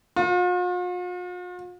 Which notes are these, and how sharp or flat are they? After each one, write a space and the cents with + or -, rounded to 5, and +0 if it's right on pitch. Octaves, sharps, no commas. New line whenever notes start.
F4 +45